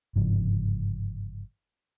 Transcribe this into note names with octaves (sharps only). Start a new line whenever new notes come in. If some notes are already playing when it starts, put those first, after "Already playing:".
G1 G#2 C#3 F3